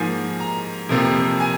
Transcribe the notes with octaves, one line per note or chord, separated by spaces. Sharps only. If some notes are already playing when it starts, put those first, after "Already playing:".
Already playing: G#2 F3 A#3 G#5
A#5
F2 C3 F3 A#3
G#5